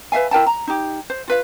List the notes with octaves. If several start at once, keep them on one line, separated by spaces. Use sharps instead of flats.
B4 E5 F5 G#5
E4 A#4 G5 A5
A#5
D#4 G4
C5
F4 B4 F5